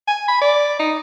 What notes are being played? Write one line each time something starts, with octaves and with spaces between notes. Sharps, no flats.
G#5
B5
D5
D#4